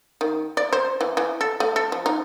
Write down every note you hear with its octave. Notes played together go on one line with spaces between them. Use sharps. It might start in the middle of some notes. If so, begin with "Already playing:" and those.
D#3
D5
C5
E3
E3
A4
A3
A4
F3
D#4